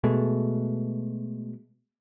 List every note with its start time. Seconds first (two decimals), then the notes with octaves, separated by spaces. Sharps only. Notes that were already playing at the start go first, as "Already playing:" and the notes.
0.04 B2 G#3 A3